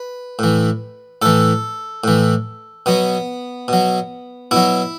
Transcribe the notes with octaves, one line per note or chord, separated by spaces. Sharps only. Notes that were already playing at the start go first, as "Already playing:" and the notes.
Already playing: B4
A2 E3
A2 E3 A4
A2 E3
B2 F#3 B3
B2 F#3
B2 F#3 E4